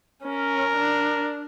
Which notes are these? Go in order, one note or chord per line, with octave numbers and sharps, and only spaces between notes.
C#4 A#4
D4